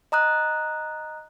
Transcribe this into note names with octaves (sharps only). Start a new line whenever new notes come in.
D#5 A#5 D#6 F#6